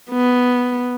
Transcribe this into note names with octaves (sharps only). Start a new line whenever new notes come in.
B3